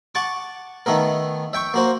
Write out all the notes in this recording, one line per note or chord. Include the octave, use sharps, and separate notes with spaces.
F#5 A5 C#6 D6
D#3 A3 B3 A#4
E5 G5 C#6
A#3 F#4 C5